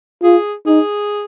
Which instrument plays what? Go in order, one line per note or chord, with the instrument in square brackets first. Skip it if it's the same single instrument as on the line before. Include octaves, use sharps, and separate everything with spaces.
[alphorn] F4 [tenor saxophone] G#4
[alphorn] D#4 [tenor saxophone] G#4